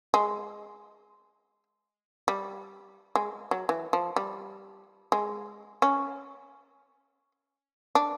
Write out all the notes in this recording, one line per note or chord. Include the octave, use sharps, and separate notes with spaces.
G#3
G3
G#3
F#3
E3
F3
G3
G#3
C#4
D4